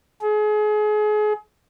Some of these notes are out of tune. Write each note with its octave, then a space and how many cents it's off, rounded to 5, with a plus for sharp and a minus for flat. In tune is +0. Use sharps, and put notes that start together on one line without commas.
G#4 +35